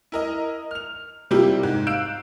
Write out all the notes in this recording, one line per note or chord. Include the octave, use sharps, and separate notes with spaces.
E4 A#4 D#5
F6 F7
C3 G3 A#3 E4 F4 G4
G#2
F5 E6 F#6 G6 D7 E7